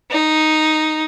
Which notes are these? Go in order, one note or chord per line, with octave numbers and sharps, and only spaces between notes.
D#4